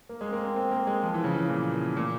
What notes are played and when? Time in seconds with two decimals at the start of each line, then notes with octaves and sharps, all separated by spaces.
0.09 A#3
0.21 G#3
0.28 C4
0.33 A#3
0.44 C4
0.56 C4
0.71 A#3
0.87 G#3
1.03 F3
1.14 E3
1.24 C#3
1.34 E3
1.50 A#2
1.97 A#2